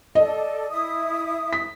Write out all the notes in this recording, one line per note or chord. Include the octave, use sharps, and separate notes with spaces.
A4 D5 D#5
E4 E5 D#6
B6